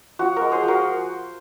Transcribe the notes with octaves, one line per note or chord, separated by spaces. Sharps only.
F3 F#4
G#3 F#4 A#4
G#4 C5
F3 F#4 A#4